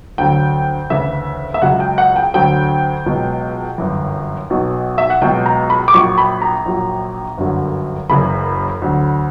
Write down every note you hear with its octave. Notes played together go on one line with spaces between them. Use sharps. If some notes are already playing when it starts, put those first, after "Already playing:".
D2 D3 F#3 G5
D2 C#3 E3 E5
E5
C#2 C#3 F#3 F#5
G5
F#5
G5
D2 D3 F#3 G5
C#2 B2 F#3
G1 F#2 E3
B1 B2 F#3
E5
F#5
C#2 B2 F#3 G5
A#5
B5
D6
A#1 A#2 F#3 C#6
B5
A#5
A#1 A#2 F#3
G1 F#2 D3 F#3
F#1 F#2 C#3 E3 B5
D2 D3 F#3